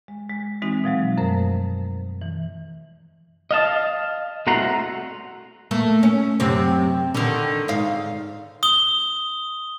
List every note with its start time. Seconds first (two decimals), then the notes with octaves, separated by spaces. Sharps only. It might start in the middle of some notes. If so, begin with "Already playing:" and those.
0.08 G#3
0.29 G#3
0.62 E3 G#3 C4 D#4 F#4
0.84 B2 F3 F#3 G#3
1.17 F#2 A3 A#4 C5
2.21 E3
3.51 D#5 F5 A5
4.47 C2 A3 F#4 F#5 A#5 C6
5.71 A3 A#3
6.03 C#4
6.40 F#2 C3 C4
7.14 D3 D#3
7.68 G#2 F5
8.63 D#6 G7